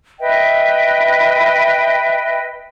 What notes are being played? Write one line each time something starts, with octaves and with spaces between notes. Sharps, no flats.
B4 D#5 E5 G5